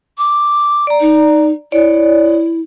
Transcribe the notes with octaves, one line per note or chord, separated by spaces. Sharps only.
D6
D5 A#5
D#4
E4 C#5 D5